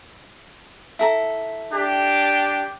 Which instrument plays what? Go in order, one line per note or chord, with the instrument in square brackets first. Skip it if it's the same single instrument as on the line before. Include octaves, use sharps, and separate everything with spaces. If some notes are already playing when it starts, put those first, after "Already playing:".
[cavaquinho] E4 A4 A#5
[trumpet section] D4 G4